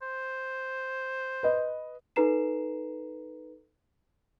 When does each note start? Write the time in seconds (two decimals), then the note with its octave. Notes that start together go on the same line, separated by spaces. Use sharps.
0.02 C5
1.43 B4 D#5
2.16 D#4 A4 B4 A#5 C7 E7